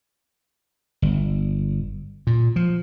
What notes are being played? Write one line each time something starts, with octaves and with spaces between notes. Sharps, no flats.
G1
A#2
F3